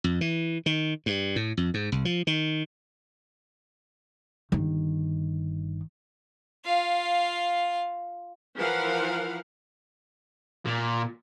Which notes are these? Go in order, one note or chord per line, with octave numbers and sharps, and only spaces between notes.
F2
E3
D#3
G2
A2
F2
G#2
C2
F3
D#3
G1 D#3
F4 F5
E3 F3 A#4 B4 F5 F#5
A#2